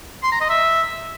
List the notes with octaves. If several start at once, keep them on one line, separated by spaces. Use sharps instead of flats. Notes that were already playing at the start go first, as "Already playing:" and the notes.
C6
A#5
D#5
E5